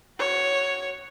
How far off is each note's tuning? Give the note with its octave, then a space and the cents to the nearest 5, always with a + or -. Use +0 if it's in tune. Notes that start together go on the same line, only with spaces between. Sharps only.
F#4 +0 C#5 +0